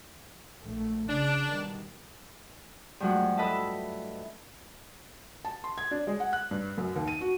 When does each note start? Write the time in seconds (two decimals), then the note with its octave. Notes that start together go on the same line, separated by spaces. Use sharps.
0.62 A#1 A3
1.09 C#3 D4
1.49 B2 D#3 G3
3.00 G2 F3 F#3 G#3 A3 F#5
3.37 E4 A4 B4 D#5 E5 A5
5.45 A5
5.64 C6
5.78 G#6
5.91 D4
6.07 G#3
6.20 F#5
6.33 F#6
6.51 G2
6.78 F#2
6.96 D#2
7.08 D#7
7.21 F#4